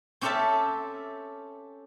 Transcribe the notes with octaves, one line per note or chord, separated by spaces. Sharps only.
C4 C#4 G4 A4 E5 A5